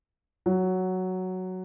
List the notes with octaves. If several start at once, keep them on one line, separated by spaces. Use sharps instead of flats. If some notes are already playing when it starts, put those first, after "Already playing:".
F#3